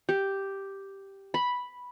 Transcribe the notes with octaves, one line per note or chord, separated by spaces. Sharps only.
G4
B5